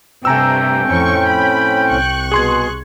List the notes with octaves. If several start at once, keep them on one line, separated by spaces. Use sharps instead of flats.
G2 C3 A3 G5 G#5 A#5 E6
F2 A2 C4 C#4 C#6
B5
C2 C#6 F#6
B2 G#4 C6 G#6